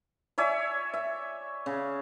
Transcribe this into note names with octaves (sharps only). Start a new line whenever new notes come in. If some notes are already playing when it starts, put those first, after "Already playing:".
C#5 D5 E5 G#5
E5
C#3